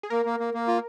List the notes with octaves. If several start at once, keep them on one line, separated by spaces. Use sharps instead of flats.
G#4
A#3 A#4
A#3
A#3
A#3
F4